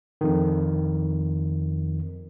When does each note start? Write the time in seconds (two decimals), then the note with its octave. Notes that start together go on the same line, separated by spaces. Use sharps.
0.21 F2 D#3